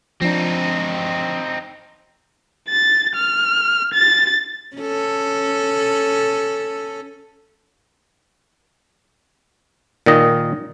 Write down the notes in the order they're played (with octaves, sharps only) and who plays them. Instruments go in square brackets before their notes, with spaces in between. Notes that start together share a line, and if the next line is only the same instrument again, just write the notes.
[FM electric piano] F3 D4 [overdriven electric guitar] C4 D#4
[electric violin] A6
F6
A6
[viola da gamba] C#4 A4
[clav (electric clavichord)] A#2 D#3 D#5